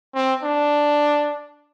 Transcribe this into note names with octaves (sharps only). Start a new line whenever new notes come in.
C4
D4